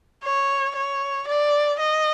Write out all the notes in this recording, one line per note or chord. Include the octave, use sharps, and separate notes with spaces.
C#5
C#5
D5
D#5